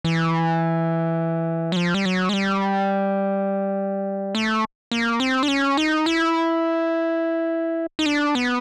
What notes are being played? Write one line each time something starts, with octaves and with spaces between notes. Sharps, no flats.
E3
F#3
F3
G3
F#3
G#3
G3
A3
A#3
C4
D4
C#4
D#4
E4
D#4
D4
B3